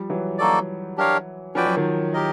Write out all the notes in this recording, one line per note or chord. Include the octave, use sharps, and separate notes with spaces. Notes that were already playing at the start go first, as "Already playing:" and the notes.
Already playing: F3 G3
E3 F#3
A#3 D#4 F#4 A4 D5
D4 G4 A#4 C#5 F5
F3 C#4 F#4 B4 D5 G5
F#3
D#3 F3
G4 A#4 D#5